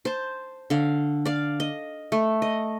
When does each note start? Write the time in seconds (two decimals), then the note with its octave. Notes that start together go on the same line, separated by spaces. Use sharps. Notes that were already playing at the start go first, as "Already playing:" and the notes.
0.05 C5 A5
0.70 D3 F5
1.25 D5 F5
1.60 D#5
2.12 A3
2.42 D#5